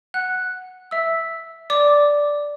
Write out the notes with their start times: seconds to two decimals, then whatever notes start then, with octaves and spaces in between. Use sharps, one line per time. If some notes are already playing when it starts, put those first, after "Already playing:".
0.14 F#5 F#6
0.91 E5 E6
1.70 D5 D6